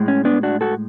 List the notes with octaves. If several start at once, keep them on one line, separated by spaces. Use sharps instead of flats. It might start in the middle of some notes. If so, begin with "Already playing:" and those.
Already playing: A2 G#3
C#4
B3 D4
D4 F#4
F#4 A4